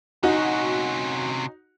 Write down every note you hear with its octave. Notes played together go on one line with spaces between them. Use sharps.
C3 C#4 D#4 F#4